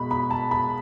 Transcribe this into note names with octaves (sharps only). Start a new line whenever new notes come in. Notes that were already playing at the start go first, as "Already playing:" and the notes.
Already playing: B2 G#3 B3 B5
B5
A5
B5